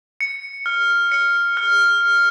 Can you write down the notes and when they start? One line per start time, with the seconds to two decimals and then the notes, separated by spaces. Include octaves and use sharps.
0.21 C#7
0.66 F6
1.12 C#7
1.57 F6